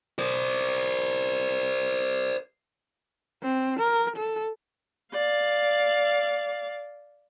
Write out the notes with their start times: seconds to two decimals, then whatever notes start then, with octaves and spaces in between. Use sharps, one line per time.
0.19 C5 D5
3.43 C4
3.80 A#4
4.17 A4
5.13 D5 F5